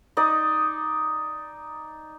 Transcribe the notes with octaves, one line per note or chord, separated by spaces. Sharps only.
D#4 D5 D#5 D#6